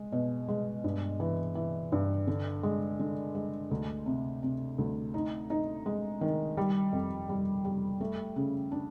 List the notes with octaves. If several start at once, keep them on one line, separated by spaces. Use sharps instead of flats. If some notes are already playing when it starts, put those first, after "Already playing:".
Already playing: G#3
B2
G#3
G2
E3
E3
G2
D3
G#3
D3
G#3
D2
C3
C3
D2
D#4
D#4
G#3
D#3
G3
F2
G3
G3
A3
C#3
D4